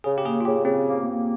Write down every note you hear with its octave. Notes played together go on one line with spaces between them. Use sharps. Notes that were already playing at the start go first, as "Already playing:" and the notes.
C#3 G#4
G4
A#3 G#4
F4
C#3 G4
C#3 C4
A#3
A#3